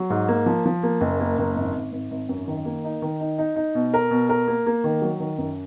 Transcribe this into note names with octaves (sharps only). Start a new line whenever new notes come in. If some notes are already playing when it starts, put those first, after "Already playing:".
Already playing: F#3
G#2
A#3
F3
F3
A#3
F#1
A#3
F#1
G#1
G#1
G#1
G#1
F#2
D#3
A#3
D#4
D#3
D#4
D#4
D#4
B2
A#4
B2
A#4
A#3
A#3
D#3
F#3
D#3
F#2